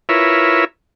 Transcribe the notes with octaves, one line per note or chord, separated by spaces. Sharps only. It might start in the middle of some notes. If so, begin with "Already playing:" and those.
E4 F4 A#4 B4 C#5 E5